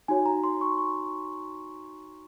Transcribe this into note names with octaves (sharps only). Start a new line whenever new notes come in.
D#4 F#4 C#5 G#5
A#5
C6
C#6
C#6